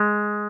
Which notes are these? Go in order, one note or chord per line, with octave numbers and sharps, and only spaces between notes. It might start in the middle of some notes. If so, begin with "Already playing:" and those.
Already playing: G#3